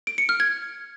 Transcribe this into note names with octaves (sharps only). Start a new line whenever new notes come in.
D7
C#7
F6
G#6